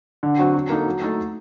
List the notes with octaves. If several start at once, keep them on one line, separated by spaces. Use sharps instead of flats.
D3
F#3 C4 F#4
F#3
A#3 D#4 A4
F#3
A3 D#4 A4